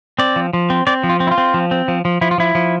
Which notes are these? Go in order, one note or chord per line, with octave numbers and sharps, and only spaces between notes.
C4 D5
F3
F3
C4
C4 D5
F3
F4
C4
E4
F4
C4
F3
C4
F3
F3
F3 E4
F4
F3 E4
F3